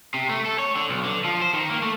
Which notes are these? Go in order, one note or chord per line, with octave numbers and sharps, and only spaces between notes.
C3
A3
A4
C#5
D3
B1
D3
F3
C5
D#3
A#3
A3